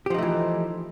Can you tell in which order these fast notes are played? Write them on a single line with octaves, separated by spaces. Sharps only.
G4 F3 D#4 A3 E3